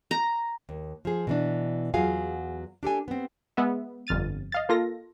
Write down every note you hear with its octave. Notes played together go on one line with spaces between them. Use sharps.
A#5
D#2
F3 G#4
B2 E3 D4
E2 F#3 F4 G#4 F5 G#5
D4 G4 A4 G#5
B3 C4
G#3 B3 E5
G1 F2 F6 A6 D#7
D#5 F5 A6
A#3 F4 A4 A#6